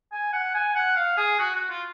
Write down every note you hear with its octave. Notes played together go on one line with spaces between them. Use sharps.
G#5
F#5
G#5
F#5
F5
G#4
F#4
F#4
F4